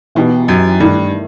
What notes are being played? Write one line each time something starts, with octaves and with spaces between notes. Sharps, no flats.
B2 E3 B3 D#4 G4
F#2
G2 D#3 A3 E4